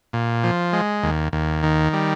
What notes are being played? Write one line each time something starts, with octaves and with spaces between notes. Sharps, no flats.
A#2
F3
G#3
D#2
D#2
D#3
G3